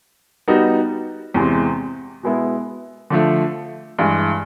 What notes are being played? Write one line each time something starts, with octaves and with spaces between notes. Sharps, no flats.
G3 B3 D#4 F#4
E2 C3 E3 G#3 C4
B2 G#3 B3 E4
D3 F3 A3
G2 E3 G#3